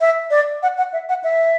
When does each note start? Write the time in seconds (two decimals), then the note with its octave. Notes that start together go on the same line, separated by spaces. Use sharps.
0.01 E5
0.31 D5
0.63 F#5
0.78 F#5
0.93 E5
1.09 F#5
1.24 E5